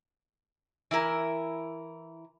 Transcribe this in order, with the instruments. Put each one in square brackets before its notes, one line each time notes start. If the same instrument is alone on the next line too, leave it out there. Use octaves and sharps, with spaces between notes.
[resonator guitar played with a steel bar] E3 E4 A#4